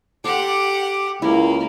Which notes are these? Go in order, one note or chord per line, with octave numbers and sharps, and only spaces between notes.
G4 A4 F#5 C6 D6
C#2 A#3 E4